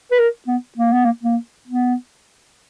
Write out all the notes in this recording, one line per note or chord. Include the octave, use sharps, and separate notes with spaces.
B4
A#4
B3
A#3
B3
A#3
A#3
B3